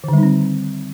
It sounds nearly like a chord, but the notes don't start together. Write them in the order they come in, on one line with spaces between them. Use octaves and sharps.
D#3 D3 G3 D#4 C4